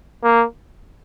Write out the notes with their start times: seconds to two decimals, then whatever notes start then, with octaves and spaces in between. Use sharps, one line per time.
0.23 A#3